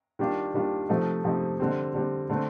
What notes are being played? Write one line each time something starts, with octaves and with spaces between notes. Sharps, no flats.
D#3 G3 D4 F4
D#3 G3 D4 F4
C3 F3 A3 D#4
C3 F3 A3 D#4
D3 G3 C4
D3 G3 C4
D3 A3 C4